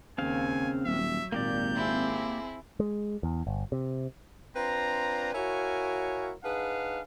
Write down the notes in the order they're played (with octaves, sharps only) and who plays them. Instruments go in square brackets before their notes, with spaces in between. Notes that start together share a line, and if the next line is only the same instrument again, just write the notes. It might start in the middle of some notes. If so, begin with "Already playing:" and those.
[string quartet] D#2 [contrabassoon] C#3 [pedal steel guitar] C4 F5 [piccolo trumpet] G#5
[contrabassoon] D#1 [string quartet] F#3 [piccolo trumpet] E5
[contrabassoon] G#1 [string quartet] A#2 [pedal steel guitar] A#3 G4 D5 [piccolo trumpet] G6
[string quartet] C4 E4 G#4
[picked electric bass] G#3
E2
G1
C3
[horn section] C4 D4 F4 B4 A#5
E4 F#4 A#4 C#5 F5 G#5
D4 D#4 G#4 B4 F5 F#5